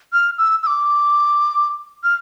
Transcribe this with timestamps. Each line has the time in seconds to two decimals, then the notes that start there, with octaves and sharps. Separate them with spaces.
0.13 F6
0.38 E6
0.63 E6
0.67 D6
2.04 F6